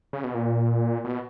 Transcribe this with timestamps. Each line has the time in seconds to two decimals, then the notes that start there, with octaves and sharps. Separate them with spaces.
0.13 C#3
0.24 B2
0.34 A#2
1.05 B2